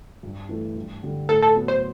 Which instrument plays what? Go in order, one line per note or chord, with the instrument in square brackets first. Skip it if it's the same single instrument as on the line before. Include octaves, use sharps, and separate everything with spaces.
[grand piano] G2
E3 A3 E4
G2
D3 G3
[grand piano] A2 [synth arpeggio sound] A4
[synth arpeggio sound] A4
[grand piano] F#3 B3
[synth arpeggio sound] C5